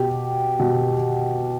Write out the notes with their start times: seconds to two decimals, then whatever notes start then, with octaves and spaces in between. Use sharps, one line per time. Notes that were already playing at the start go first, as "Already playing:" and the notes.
Already playing: B2 G4
0.59 B2